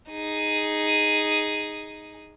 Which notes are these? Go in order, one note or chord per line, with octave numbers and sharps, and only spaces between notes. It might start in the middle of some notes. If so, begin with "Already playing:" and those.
D#4 G#4